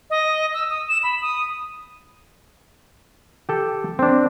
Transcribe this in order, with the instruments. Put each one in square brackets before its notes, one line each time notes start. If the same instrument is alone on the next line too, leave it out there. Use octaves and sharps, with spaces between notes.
[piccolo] D#5
E6
D#6
E7
B5
D#6
[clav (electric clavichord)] G4 A4
C4 D4